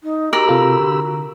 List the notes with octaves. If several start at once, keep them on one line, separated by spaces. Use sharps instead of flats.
D#4
F#4 G4 A#4 B5 E6
C3 F4 A4
D3